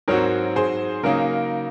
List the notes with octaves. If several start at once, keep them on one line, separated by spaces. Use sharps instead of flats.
G#2 F#3 C4 F#4 A#4 C#5
G#4 C5
C#3 F#3 A#3 D#4 A#4